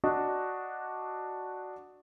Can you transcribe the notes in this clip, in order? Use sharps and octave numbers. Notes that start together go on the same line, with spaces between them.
D4 F#4 D#5